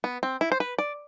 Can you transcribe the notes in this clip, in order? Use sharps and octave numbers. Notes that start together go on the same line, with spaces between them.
B3
C4
E4
C5
B4
D5